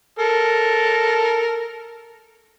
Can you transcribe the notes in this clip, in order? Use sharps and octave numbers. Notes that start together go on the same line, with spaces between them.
A4 A#4